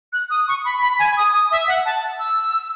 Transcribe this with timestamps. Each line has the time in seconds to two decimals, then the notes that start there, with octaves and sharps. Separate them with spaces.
0.13 F#6
0.30 D#6
0.48 C#6
0.65 B5
0.82 B5
0.99 G#5
1.17 D#6
1.34 D#6
1.51 E5
1.68 F#5
1.85 A5
2.19 E6